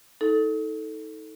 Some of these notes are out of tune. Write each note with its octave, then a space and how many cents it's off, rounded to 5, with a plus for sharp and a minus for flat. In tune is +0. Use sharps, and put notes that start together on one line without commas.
D#4 +35 A4 +0